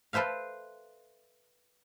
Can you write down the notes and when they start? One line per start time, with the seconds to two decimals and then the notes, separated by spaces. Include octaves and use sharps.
0.13 A4 B4 C5 E5 F5